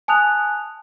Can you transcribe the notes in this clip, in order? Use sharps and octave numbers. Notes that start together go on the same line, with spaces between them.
G#5 A5 D#6 F#6 F7